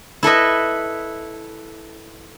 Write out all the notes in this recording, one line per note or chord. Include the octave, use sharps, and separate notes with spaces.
E4 A4 B4 D#5